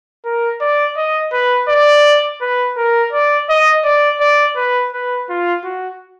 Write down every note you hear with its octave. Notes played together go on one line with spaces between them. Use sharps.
A#4
D5
D#5
B4
D5
B4
A#4
D5
D#5
D5
D5
B4
B4
F4
F#4